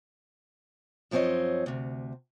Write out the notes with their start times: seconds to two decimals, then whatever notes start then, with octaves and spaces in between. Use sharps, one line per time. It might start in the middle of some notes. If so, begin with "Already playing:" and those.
1.11 F#2 F3 C4 G4 C#5 D#5
1.66 D2 C3